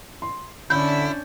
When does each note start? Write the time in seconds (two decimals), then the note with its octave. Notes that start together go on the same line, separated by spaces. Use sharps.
0.22 C6
0.70 D3 C#4 D4 E4 G6